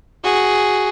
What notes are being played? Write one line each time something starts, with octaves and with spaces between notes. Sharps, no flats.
F#4 G#4